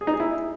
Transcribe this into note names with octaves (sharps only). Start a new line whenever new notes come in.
G#4
D#4
G#4
E4